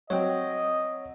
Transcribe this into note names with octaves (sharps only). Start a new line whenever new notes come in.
F#3 C4 C#5 D#5 G5